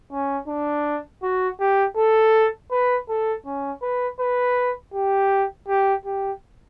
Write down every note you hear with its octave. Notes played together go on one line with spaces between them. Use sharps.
C#4
D4
F#4
G4
A4
B4
A4
C#4
B4
B4
G4
G4
G4